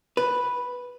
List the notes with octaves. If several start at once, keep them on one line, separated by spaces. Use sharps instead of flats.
B4